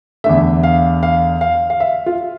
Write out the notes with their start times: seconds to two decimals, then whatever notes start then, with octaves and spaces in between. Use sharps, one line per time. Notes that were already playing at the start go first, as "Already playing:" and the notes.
0.24 E2 D3 A3 E5
0.63 F5
1.03 F5
1.41 F5
1.70 F5
1.80 E5
2.06 F4